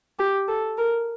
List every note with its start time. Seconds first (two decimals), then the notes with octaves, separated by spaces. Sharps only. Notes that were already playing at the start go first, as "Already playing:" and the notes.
0.19 G4
0.48 A4
0.77 A#4